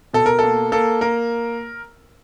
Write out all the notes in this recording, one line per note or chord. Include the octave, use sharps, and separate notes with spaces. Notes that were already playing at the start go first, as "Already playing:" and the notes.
B2 A4
A#4
A#3 A4
A#3 A4
A#3 A#4